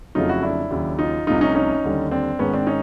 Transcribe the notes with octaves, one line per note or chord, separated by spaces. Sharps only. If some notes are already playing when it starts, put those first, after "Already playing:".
F2 C#3 F#3 A3 D#4 F4
E4 F#4
D4 E4
D#2 C#3 F#3
D#4 F4
C2 C3 F3 A3 D#4 F4
C#4 D#4
C#4 D#4
D#2 D3 G3
C4 D4
G#2 D#3 G#3 B3 C#4
C4 D4
C#4 D#4